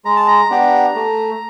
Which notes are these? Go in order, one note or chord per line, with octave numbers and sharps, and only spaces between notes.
G#3 A#5
A5
A#5
B3 D4 G4
A3